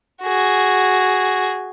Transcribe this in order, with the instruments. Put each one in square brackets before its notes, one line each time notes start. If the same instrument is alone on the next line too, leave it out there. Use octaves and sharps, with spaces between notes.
[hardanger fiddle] F#4 G#4